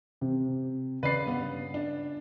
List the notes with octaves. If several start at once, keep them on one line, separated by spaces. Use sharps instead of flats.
C3
C#3 B4 D5 C7
G2 B3
D4